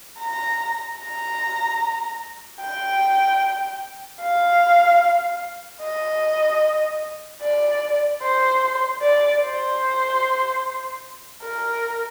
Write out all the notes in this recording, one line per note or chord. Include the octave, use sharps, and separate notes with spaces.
A#5
A#5
G5
F5
D#5
D5
C5
D5
C5
A#4